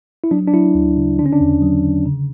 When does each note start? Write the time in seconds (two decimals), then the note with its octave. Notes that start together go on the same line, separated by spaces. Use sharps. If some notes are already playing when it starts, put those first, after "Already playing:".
0.24 E4
0.31 F#3 D4
0.48 D4
0.53 F#3 E4
0.75 D2
0.97 C#3
1.19 D3 D4
1.26 C#4
1.33 D4
1.40 E2
1.62 F#3
1.83 D3
2.06 C#3